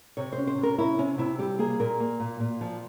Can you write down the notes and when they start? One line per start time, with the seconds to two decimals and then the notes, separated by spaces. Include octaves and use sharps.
0.17 C3 C#5
0.33 C5
0.38 C#4
0.47 C5
0.58 C3
0.63 A#4
0.78 C#4 E4
0.98 C3 C#4
1.18 C3 E4
1.39 G3 G4
1.59 A#3 G#4
1.79 A#2 A#4
2.00 A#3
2.20 A#2
2.40 A#2
2.61 F3